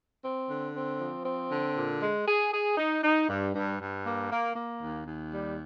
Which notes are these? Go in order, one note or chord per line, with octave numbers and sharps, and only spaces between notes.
C4
D3
C4
F3
C4
D3
A#2
G#3
G#4
G#4
D#4
D#4
G2
G2
G2
A#3
A#3
A#3
D#2
D#2
G3